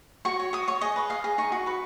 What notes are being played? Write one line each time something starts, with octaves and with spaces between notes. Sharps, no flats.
F#4 C#6
C#5
F#4 D#6
C#5 C#6
G#4 D#5
B4
D#5 F5
G#4
D#4 C#6
F#4
B4 C#6